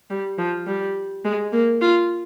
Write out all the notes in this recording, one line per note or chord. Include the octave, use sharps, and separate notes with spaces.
G3
F3
G3
G#3
A#3
F4